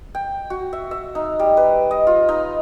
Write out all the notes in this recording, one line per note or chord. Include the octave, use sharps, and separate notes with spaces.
G5
F#4
E5
E5
D#4
G3
B4
D#5
F4
D#4